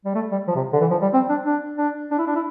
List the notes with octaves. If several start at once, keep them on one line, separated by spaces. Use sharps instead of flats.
G3
A3
G3
F3
C3
D3
E3
F3
G3
C4
D4
D4
D4
D4
E4
D4
E4